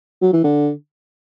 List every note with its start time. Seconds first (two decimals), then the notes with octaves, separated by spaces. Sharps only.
0.22 F#3
0.33 E3
0.44 D3